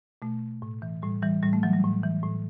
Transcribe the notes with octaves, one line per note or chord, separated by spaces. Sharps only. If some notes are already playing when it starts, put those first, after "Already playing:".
B2 A3
A2
E3
A2 G3
E3 G3
A2 G3
A3
E3 F#3
G3
A2
E3
A2